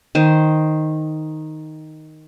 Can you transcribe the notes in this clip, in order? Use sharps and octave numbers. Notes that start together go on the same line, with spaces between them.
D#3 C5